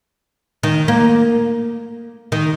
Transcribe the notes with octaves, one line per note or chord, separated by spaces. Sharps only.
D#3
A#3
D#3